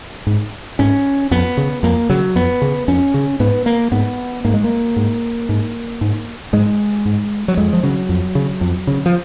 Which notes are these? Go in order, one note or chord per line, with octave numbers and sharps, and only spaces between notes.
G#2
G#2 C#4
F2 B3
C#3
F2 A#3
C#3 F#3
F2 B3
C#3
F2 C#4
C#3
G#2 B3
A#3
G#2 B3
G#2 A#3
G#3
A#3
G#2
G#2
G#2
G#2 G#3
G#2
F#3
F2 G#3
F3
C#3 F#3
F2
C#3
F2
C#3
F3